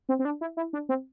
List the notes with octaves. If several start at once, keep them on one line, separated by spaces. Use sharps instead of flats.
C4
C4
D4
E4
E4
D4
C4